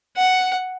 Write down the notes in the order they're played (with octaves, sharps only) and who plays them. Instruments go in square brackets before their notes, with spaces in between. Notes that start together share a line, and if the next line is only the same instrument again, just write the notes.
[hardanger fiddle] F#5